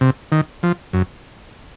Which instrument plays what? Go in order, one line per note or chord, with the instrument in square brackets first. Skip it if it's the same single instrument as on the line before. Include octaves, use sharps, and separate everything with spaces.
[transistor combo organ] C3
D#3
F3
F#2